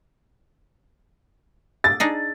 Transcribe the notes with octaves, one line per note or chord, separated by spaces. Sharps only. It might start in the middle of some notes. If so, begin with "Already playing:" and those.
A6
D4 D#4 G#4